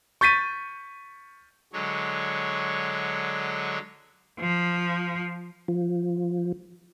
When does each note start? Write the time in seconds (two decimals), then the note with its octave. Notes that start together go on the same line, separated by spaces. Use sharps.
0.21 C#6 G6 A6 B6 D#7
1.73 D3 F#3 G#3 C#5
4.40 F3
5.68 F3